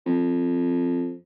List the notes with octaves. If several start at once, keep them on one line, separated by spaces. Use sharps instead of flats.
F2